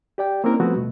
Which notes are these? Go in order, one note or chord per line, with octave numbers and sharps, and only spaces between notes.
G4 D5 G5
A#3 C4 C#4 E4 A#4
F3 G3 A3 B3 C4 F#4
D#2 B2 A3